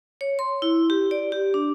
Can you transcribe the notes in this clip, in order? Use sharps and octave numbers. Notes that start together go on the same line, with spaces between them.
C#5
C6
E4
G4
D5
G4
D4